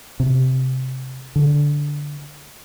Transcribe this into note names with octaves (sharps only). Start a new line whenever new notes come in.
C3
D3